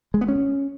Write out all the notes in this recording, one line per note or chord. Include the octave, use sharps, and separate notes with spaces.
G#3
B3
C#4